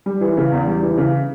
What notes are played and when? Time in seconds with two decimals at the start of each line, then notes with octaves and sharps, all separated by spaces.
0.06 G3
0.21 E3
0.37 C#3
0.52 E2
0.67 G3
0.83 E3
0.97 C#3